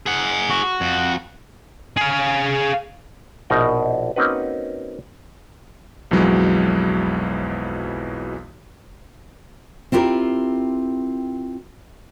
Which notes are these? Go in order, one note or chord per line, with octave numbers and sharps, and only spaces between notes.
G#4 F#5
F#4
F2
G#4 F5
A#1 B2 D#4 A#4 D5 D#5
A#3 C4 C#4 D#4 F#4 B4
B1 F2 E3 F#3 G#3
C4 E4 F4 G4 A#4